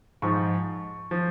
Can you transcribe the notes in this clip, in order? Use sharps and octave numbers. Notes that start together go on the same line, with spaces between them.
G#2 F3 C#6
F3